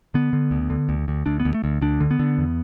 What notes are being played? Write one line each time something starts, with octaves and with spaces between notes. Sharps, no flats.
D3 B3
D3
D2
D3
D2
D2
D2 D4
B3
D2
A3
D2
D2 D4
D3
B3
D3
E2